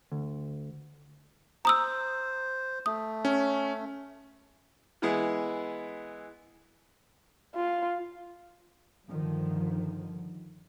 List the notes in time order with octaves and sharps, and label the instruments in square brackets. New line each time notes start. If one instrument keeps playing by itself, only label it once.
[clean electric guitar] D2
[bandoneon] C5 [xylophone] A#5 D#6 E6
[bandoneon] A3 [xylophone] D#6
[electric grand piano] C#4
[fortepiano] E3 G#3 B3 E4 G#4
[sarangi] F4
[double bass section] G2 D3 D#3 F3